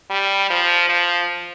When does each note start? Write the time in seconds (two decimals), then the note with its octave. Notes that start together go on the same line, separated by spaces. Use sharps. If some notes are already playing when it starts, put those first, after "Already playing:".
0.10 G3
0.50 F3
0.89 F3